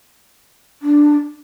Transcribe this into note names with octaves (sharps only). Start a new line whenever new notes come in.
D4